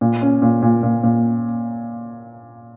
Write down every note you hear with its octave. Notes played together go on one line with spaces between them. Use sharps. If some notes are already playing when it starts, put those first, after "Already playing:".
A#2
C#4
A#2
A#2
A#2
A#2